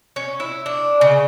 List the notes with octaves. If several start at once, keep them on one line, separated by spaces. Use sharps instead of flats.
C#4
E4
D4
C#3